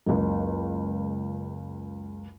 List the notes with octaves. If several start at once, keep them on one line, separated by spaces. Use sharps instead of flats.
F#1 C#2